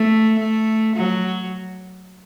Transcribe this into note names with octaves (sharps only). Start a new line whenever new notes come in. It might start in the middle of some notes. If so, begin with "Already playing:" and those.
Already playing: A3
A3
F#3